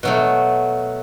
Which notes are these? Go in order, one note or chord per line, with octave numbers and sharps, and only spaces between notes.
B2 F#3 A3